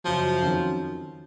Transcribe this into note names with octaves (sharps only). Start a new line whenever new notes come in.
F#2 C#3 F3 F#3
F2 D#3 F#3 C#4